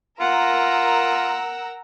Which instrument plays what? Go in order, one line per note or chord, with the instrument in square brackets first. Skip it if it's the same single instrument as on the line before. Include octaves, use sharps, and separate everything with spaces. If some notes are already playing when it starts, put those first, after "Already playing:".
[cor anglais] F4 [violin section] A#4 A#5 E6 [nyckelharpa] F#5